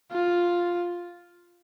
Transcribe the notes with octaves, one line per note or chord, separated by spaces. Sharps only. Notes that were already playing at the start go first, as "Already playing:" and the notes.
F4